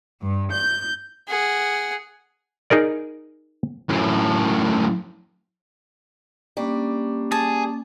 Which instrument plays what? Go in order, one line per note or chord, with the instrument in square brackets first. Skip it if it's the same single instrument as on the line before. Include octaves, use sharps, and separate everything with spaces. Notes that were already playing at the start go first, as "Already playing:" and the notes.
[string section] G2
G6
[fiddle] G#4 F#5
[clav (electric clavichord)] D#4 G#4 A#4 D5
[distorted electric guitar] F#2 A2
[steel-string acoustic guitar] G3 D4 [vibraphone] A#3 C#4 D6
[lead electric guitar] G#4 [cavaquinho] A5